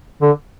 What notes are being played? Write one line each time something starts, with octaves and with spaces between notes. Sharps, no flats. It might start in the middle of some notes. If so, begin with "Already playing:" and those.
D3